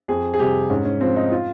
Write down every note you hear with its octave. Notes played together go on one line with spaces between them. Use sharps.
F2 G#4
G#4
C3 G3 G4
G#2 C#4
C#4
F3 C4
D#4
F4